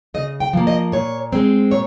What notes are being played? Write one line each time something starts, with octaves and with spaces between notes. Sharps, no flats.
C#3 D#5
G5
F3 A#3
D#5
A#2 C#5
G#3 C4
A#2 C#5